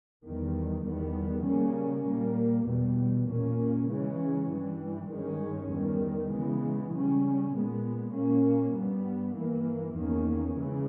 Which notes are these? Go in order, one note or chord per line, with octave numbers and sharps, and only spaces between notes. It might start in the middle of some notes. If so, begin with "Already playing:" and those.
E2 D#3 G3
E2 D#3 G3 B3
C#3 G3 A#3 C#4
A#2 G3 A#3
E2 B2 G3
A#2 A#3 C#4
C#3 E3 G#3 C#4
G2 E3 G3
G2 D#3 G#3 C#4
E2 D#3 G3
C#3 E3 G#3 B3
C#3 G3 C#4
A#2 G#3 B3
A#2 A#3 C#4
G2 G3 B3
G2 E3 A#3
E2 D#3 A#3 C#4
C#3 E3 G#3